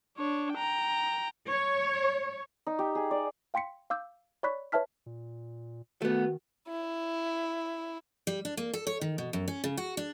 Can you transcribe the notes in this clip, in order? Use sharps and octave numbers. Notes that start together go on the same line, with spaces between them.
D4 C#5
G5 A#5
C#5
D#4
G4
G#4
D5
F5 G5 C6 B6 C#7
F5 D6 E6 G6
C#5 D5 B5 C#6 F#6 B6
B4 C#5 E5 A5 F6 B6
A#2
D#3 A3 B3 F#4
E4
G3
D4
A#3
A4
C#5
D#3
B2
F#2
C#4
C#3
F#4
D4